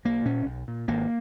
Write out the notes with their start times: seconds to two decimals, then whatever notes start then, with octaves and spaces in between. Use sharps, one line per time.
0.05 B1 A#3
0.25 A#2 C#4
0.46 B1
0.68 A#2
0.88 G#1 A#3